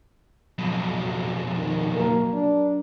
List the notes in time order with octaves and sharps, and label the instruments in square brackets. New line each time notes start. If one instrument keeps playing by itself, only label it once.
[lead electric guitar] B1 F2 [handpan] F#3
[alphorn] D#3
[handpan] F#3 A#4 [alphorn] A#3
[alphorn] D4